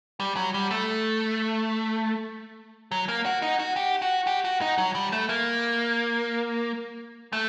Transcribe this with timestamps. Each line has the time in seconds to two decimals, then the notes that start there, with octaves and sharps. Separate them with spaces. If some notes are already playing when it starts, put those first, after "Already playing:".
0.20 G3
0.37 F#3
0.54 G3
0.71 A3
2.92 F#3
3.08 A#3
3.25 F#4
3.42 D#4
3.59 F#4
3.76 G4
4.02 F#4
4.27 G4
4.45 F#4
4.61 D#4
4.78 F#3
4.95 G3
5.12 A3
5.29 A#3
7.33 A3